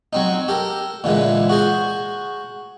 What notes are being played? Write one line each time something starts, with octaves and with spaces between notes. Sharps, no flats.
F#3 C4 D#4
G4 A4 A#4
A#2 D3 E3 G#3
F#4 G#4 C5